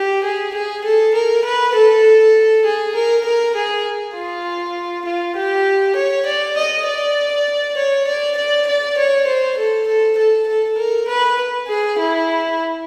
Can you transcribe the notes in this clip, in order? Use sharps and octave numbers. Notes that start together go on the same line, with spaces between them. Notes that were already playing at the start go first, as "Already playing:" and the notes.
Already playing: G4
G#4
G#4
A4
A#4
B4
A4
G#4
A#4
A#4
G#4
F4
F4
G4
C#5
D5
D#5
D5
C#5
D5
D5
D5
C#5
C5
A4
A4
A4
A4
A#4
B4
G#4
E4